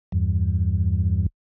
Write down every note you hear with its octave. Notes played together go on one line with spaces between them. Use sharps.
E2 G2